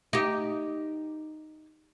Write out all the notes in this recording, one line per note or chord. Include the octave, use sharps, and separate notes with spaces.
D#4 G4